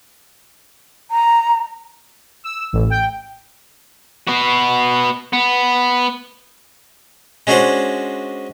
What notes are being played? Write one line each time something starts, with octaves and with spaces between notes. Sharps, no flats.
A#5
E6
A1
G5
B3 F#4
B3
G#3 C#4 D4 F#4 C5 D5